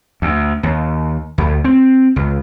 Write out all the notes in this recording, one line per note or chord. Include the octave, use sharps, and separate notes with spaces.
D2
D#2
D2
C4
C#2